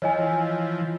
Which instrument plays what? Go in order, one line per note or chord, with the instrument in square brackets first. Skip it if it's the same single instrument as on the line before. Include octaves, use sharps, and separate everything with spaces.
[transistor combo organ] E3 F3 [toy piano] C#5 D#5 G#5